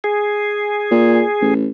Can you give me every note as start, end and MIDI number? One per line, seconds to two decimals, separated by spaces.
0.04 1.54 68
0.91 1.22 46
1.41 1.68 33